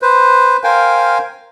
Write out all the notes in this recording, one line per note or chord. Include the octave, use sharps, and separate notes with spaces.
B4 C5
A#4 C5 F5 G5 G#5